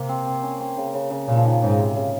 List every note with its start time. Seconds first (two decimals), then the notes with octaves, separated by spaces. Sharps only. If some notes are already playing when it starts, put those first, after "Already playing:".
Already playing: C3 A#3
0.09 C4
0.26 C4
0.43 C#4
0.60 C4
0.77 C#3
0.94 C#3
1.10 C#3
1.28 A#2 C#3
1.37 F3
1.45 D#3
1.62 G#2 C#3
1.79 C3
1.96 C#3